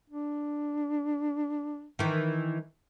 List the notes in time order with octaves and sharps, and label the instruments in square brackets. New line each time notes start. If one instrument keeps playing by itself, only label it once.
[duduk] D4
[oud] D#3 E3